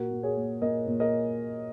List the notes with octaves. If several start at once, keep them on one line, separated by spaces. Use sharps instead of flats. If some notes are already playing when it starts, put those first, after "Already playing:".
Already playing: A#2 F#4 A#4
A#2
G#4 C#5
A#3
A#2 A#4 D#5
A#2
A#4 D#5